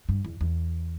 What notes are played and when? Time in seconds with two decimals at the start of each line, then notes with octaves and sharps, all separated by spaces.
0.09 G2
0.25 E2
0.41 E2